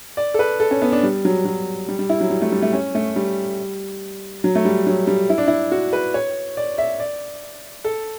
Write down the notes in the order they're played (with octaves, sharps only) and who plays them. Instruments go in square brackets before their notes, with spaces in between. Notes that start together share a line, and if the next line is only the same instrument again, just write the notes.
[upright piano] D5
A4
B4
A4
C#4
B3
D4
G3
F#3
F#3
G3
G3
E4
F#3
G3
A3
G3
A3
C#4
A3
G3
F#3
A3
G3
F#3
G3
E4
D4
E4
F#4
B4
C#5
D5
E5
D5
A4